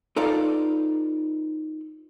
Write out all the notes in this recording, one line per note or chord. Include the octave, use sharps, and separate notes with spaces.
D#4 F4 A4 B4 D5 F5